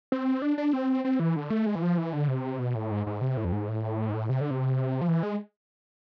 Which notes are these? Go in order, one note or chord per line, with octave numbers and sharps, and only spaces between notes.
C4
D4
D4
C4
C4
E3
D3
A3
G#3
E3
F3
E3
D3
C3
B2
A2
G#2
G#2
C3
A2
F2
G#2
A2
G#2
A2
C3
D3
C3
F3
E3
G#3